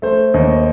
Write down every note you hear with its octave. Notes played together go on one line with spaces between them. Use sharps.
A3 C5
D#2 D#5